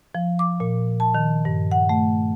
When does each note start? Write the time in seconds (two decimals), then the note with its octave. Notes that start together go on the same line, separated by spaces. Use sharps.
0.15 F3
0.39 D6
0.60 A#2
1.00 A5
1.15 D#3
1.45 G2
1.71 F#5
1.89 A3